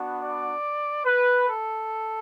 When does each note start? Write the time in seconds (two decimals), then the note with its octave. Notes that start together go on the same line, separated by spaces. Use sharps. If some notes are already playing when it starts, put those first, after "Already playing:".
Already playing: B3 D4 F#4
0.21 D5
1.05 B4
1.48 A4